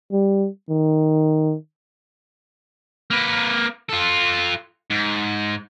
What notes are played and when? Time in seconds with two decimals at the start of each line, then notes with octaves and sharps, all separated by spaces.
0.12 G3
0.69 D#3
3.11 A#3 B4
3.89 F4 A4
4.90 G#2